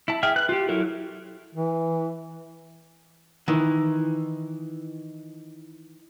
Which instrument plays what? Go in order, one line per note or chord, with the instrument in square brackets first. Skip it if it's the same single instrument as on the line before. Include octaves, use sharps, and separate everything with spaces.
[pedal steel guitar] E4 A5
G#4 E5 G5 F6
B4 F#6
F4 G4
F#3 E4 A4 A#4
[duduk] E3
[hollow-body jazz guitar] D#3 E3